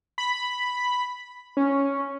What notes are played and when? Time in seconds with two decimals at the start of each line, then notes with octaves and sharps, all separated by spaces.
0.18 B5
1.57 C#4